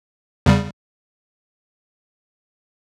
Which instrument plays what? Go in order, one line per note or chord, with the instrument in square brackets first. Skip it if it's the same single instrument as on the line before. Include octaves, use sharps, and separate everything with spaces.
[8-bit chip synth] E2 C#3 G3